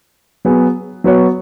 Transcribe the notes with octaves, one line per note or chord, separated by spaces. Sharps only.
F#3 B3 G#4
F#3 B3 F#4 C#5